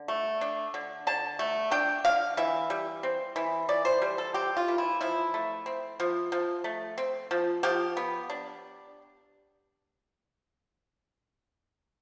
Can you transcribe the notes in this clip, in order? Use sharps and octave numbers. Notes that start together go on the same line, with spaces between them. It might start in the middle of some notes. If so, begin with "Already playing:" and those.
Already playing: D3
A3
D4
D3
D3 A5
A3
D4 G5
D3 F5
E3 E5
G3
C4
E3
E3 D5
C5
G3
A4
C4 G4
F4
E3
E4
F3 E4
A3
C4
F3
F3
A3
C4
F3
F3 G4
B3
D4